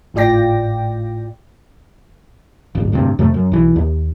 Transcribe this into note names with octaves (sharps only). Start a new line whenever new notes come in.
G#1 A2 F4 D5 G5 A#6
D1 G1
D1 D2 G2 C3
F2 C3 A3
F#2
B1 E3
D#2